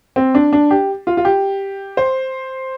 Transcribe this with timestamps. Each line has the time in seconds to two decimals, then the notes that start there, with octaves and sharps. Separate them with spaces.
0.16 C4
0.35 D4
0.53 D4
0.71 G4
1.07 F4
1.17 F4
1.25 G4
1.97 C5